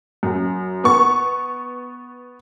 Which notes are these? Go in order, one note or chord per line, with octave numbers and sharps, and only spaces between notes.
F#2
B3 C#6